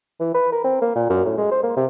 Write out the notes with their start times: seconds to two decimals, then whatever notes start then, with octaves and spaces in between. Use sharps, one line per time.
0.20 E3
0.34 B4
0.52 A#4
0.65 C4
0.82 A#3
0.96 A#2
1.10 F#2
1.26 A2
1.38 G#3
1.51 C5
1.63 A#3
1.77 C3